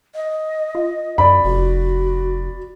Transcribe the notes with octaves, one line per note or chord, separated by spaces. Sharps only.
D#5
F4
F#2 D5 B5
F1 F#4